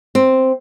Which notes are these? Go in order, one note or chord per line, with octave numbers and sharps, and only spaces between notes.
C4